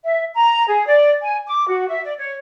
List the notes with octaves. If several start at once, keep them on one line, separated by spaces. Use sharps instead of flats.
E5
A#5
G#4
D5
G#5
D6
F#4
E5
D5
C#5